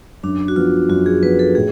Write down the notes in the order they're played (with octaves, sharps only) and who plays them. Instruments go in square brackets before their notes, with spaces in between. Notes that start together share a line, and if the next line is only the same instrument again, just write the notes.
[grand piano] F#2 [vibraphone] D4
[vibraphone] F#4
[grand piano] F3 B3 [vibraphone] F4
[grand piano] F#2 [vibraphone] F#4
[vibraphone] G#4
[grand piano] F3 B3 [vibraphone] B4
[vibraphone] A4
[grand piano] A2 [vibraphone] G#4